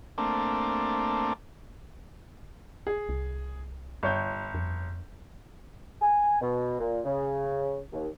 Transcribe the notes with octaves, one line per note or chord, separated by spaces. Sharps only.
A3 A#3 C4 D4
G#4
C2
G1 C#5 G6
F2
G#5
B2
A#2
C#3
D#2